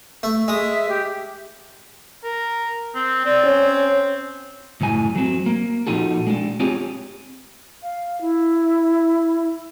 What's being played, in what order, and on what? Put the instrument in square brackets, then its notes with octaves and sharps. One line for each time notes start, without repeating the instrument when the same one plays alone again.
[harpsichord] A3
[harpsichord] G#3 D#6 [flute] E5
[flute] G4
[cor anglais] A#4
C4
[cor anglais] C4 [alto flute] D5
[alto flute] C#4
[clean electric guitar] C#2 F#2 A2 G#5
F#3 C4
A#3
A#2 F3 D#4 F#4 A4
G#3 D4
C4 F4 G4 G#4 C#5 G#5
[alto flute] F5
E4